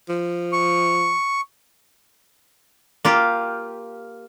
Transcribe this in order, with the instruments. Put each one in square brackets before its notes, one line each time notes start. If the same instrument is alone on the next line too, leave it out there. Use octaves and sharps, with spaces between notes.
[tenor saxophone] F3
[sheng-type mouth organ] C#6
[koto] A#3 F4 G4